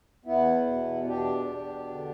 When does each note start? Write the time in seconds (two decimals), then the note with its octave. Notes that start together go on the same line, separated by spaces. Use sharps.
0.25 E2 B3 E4
0.66 B2
1.07 E2 D4 G4
1.48 B2
1.89 D3